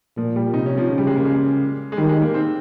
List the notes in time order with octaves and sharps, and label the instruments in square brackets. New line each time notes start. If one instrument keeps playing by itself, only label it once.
[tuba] A#2 [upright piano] F3
[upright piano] G3
[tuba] C3 [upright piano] D#4
[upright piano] C#4
F3
[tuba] C#3 [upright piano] F3
[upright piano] G3
G#3
A#3
G#3
G#3
[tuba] D#3 [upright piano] G3
[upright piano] G#3
A#3
C4